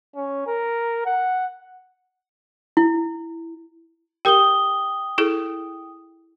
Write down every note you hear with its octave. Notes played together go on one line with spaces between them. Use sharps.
C#4
A#4
F#5
E4
G4 A#4 G5 D#6 G7
E4 G#4 A4